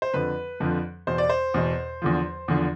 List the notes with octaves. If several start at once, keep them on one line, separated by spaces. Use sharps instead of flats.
C5
F2 D3 F3 B4
F2 D3 F3
E2 B2 C5
D5
C5
E2 B2
E2 D3 F3
E2 D3 F3